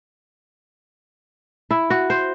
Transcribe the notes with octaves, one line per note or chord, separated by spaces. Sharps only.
E4
F#4
C5